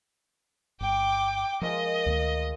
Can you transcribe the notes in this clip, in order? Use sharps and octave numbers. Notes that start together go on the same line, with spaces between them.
G1 G5 D6
F3 G#3 F4 A#4 D#5
D2 D#3 A3